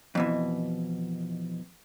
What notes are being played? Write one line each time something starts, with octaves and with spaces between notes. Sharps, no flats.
F2 B2 E3